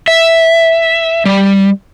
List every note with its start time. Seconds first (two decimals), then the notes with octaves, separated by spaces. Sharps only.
0.08 E5
1.25 G3